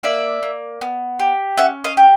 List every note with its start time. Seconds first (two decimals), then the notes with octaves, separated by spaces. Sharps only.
0.03 A#3 D5 E5
0.43 A#3
0.81 B3
1.19 G4
1.58 C#4 E5 F#5
1.84 D#5 F5
1.97 G4